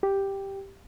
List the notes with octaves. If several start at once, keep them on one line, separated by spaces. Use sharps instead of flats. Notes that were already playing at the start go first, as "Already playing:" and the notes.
G4